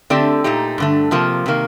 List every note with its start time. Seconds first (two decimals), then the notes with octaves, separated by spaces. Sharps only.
0.10 D3 A3 C4 G4 D5
0.44 A#2 A3 D#4 G4
0.78 G2 D3 A3
1.11 C3 F3 A#3
1.46 C3 D#3 A#3